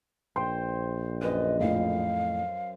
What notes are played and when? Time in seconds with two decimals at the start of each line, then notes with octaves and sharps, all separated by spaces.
0.36 A#1 C5 G5 C6
1.22 F#2 B4 D#5
1.60 F2 A2 F5